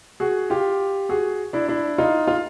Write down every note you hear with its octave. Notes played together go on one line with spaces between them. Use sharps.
F#4 G#4
F4 G4
F#4 G#4
D4 E4
D4 E4
D#4 F4
F4